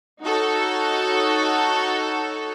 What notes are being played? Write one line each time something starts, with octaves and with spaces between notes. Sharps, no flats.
D#4 F#4 A4 C#5